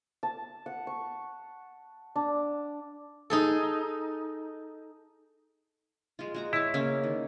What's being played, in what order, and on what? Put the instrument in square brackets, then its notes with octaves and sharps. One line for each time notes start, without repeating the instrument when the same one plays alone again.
[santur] A5
F#5
C#6
D4
[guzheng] D#4 G#4 A4
[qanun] G#3 F4
G#3 F#4 A#5
[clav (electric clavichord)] E4 [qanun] C#5 A5
[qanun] C#3 A#3 C#4
D#3